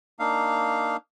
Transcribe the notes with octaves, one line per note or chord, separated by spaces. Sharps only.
A#3 D4 D#4 F5